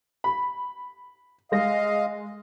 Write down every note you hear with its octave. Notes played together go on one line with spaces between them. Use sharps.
B5
G#3 D#5 F5 A#6